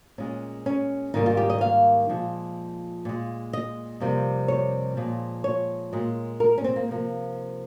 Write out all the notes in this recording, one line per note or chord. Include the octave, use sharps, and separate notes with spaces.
A#2 G#3 C#4
C#4
G#2 D#3 G3 A#3 D#4
F4
G4
D#5
F5
A#2 F3 G#3
A#2 G#3
D#5
F2 C3 G3 A#3
C#5
A#2 F3 G#3
C#5
A#2 G#3
A#4
C#4
C4
A#3
C3 F3 A#3